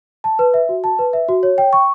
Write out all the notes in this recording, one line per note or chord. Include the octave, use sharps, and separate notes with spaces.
A5
B4
E5
F#4
A5
B4
E5
F#4
C#5
G5
C#6